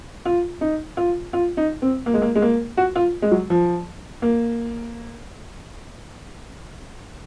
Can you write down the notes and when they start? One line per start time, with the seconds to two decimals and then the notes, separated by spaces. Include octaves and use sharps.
0.25 F4
0.61 D#4
0.97 F4
1.33 F4
1.57 D#4
1.82 C4
2.06 A#3
2.14 G#3
2.22 A#3
2.35 G#3
2.42 A#3
2.77 F#4
2.96 F4
3.22 G#3
3.31 F#3
3.50 F3
4.22 A#3